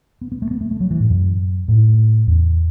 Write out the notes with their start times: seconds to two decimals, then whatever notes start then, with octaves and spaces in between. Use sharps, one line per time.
0.21 B3
0.32 B3
0.42 A3
0.51 B3
0.61 A3
0.71 A3
0.80 F#3
0.91 E3
1.00 A2
1.10 F#2
1.68 A2
2.27 E2